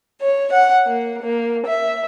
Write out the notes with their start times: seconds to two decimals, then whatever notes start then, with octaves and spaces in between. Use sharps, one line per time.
0.21 C#5
0.52 F#5
0.86 A#3
1.23 A#3
1.66 E5